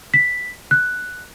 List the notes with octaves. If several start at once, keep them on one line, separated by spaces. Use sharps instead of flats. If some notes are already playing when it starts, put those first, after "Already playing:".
B6
F#6